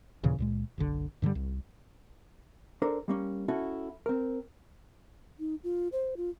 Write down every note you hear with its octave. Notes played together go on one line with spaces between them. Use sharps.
D#2 A#2 C#3 E3
C#2 A#2 G#3
F#1 B1 D3
G2 D3 D#3 G3
C2
D4 A4 A#4 C5
G3 A#3 C#4
C#4 E4 F#4 A4
C4 A#4
D#4
F4
C5
F4